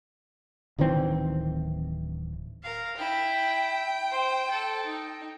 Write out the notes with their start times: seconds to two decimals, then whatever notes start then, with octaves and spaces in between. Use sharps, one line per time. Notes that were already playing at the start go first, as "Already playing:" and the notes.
0.78 D1 D#3 E3 C4
2.63 A#4 F5
2.97 E4 G5
4.10 C5
4.50 A4
4.85 D#4